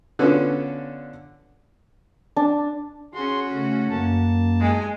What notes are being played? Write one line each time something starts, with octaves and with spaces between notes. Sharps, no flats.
D3 B3 C#4 D4 F4 A4
D4
C#4 F#4 G#4 C6
C#3 A3
F#2 A#3 A5
G#3 G#5